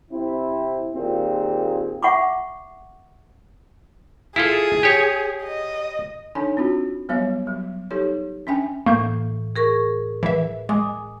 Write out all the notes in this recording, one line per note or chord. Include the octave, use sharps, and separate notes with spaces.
C3 C4 E4
D#2 A#2 C4 F4 G#4
E5 F#5 C#6 D6
E4 F4 G#4 A4
G4 C#5
D#5
D4 D#4 A4 C#5 G#5 A5
C4 D4 F4 F#4
F#3 G3 B3 C#5 D#5 E5
F#3
D#4 G4 A4 C#5
C#4 D4 E5 G5 G#5
A2 E3 A#3 G6
G#4 A#4 C#6
E3 E5
G#3 G#5 D6 D#6